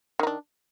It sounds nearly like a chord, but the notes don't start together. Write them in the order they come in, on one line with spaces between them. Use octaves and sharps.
D#3 D#4 D4